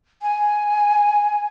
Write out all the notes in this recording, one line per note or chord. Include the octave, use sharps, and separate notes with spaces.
G#5